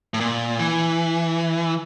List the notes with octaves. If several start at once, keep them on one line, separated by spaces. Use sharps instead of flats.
A2
A#2
E3